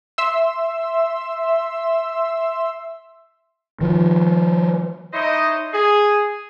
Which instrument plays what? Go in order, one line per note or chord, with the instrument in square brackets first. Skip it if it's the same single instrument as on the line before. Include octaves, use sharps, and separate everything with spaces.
[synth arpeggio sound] E5 C6 E6
[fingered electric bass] D#3 F3
[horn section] D#4 E4 C5 C#5 D#5
G#4